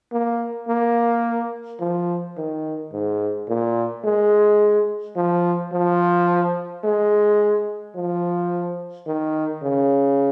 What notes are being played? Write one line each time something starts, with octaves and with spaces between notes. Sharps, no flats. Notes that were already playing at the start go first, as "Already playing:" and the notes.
A#3
A#3
F3
D#3
G#2
A#2
G#3
F3
F3
G#3
F3
D#3
C#3